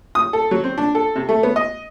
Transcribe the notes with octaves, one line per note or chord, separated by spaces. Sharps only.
D#6
A4
F#3
C4
D4
A4
C3
A3
B3
D#5